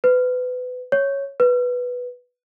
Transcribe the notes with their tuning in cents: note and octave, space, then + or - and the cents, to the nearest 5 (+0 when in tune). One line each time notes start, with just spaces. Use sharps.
B4 +25
C#5 -5
B4 -5